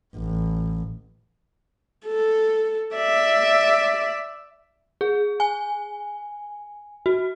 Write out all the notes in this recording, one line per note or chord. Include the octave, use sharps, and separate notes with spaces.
A1
A4
D5 E5
G#4
G#5
F#4